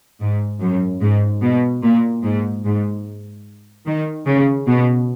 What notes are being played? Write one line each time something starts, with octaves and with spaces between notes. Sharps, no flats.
G#2
F#2
G#2
B2
A#2
G#2
G#2
D#3
C#3
B2